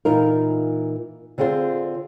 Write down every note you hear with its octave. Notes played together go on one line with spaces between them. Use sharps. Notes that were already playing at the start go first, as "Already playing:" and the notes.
A#2 E3 D#4 F4 A#4
D3 C4 F4 G#4 C5